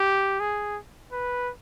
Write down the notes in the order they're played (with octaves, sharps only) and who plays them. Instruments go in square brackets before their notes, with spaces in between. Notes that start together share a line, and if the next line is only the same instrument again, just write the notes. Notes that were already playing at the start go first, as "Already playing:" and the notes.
Already playing: [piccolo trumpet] G4
G#4
B4